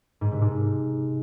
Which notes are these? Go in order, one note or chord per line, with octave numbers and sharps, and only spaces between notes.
G#2
C3
G#2